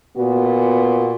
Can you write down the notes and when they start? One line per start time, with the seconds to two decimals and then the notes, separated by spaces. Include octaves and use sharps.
0.17 A#2 B3 F#4